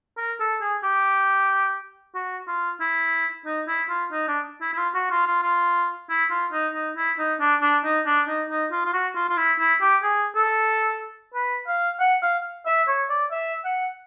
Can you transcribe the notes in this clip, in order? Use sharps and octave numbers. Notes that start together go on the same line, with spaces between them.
A#4
A4
G#4
G4
F#4
F4
E4
D#4
E4
F4
D#4
D4
E4
E4
F4
F#4
F4
F4
F4
E4
F4
D#4
D#4
E4
D#4
D4
D4
D#4
D4
D#4
D#4
F4
F4
F#4
F4
F4
E4
E4
G4
G#4
A4
B4
F5
F#5
F5
E5
C#5
D5
E5
F#5